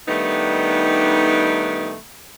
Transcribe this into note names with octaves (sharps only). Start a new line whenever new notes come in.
D#3 G3 A3 B3 D4 D#4